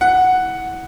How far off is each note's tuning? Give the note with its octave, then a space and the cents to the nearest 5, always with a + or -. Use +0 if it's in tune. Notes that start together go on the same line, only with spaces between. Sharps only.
E4 -20 F#5 +0